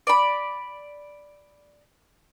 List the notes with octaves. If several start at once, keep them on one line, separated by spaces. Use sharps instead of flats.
D5 B5